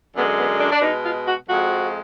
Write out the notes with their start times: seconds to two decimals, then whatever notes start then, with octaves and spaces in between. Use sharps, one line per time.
0.15 F#2 D3 G#3 B3
0.38 B3
0.60 D4
0.71 D4
0.81 B2 D#4
0.85 G#3
1.03 F4
1.26 F#4
1.48 F2 F3 G#3 F#4